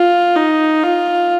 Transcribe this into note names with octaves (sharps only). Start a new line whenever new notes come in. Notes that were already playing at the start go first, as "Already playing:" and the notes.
Already playing: F4
D#4
F4